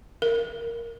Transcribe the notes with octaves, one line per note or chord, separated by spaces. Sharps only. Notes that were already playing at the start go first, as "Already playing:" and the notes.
A#4